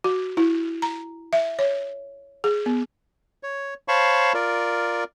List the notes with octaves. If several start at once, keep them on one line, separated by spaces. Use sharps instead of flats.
F#4
E4
A#5
E5
C#5
G#4
B3
C#5
C5 C#5 F5 A5 B5 C#6
F4 A#4 D5